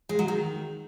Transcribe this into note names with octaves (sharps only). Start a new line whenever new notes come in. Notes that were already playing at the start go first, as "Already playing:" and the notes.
G#3
F#3
D#3